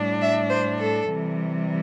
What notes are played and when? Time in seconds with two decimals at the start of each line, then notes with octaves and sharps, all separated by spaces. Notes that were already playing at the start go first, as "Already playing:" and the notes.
Already playing: A2 G3 D4
0.22 E5
0.50 C5
0.78 A4
1.08 C3 E3 G3